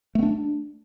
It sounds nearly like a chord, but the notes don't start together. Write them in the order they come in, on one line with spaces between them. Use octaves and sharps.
A3 B3 D4